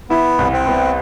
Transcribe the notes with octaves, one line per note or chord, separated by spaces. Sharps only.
B3 E4
C2
C4
B3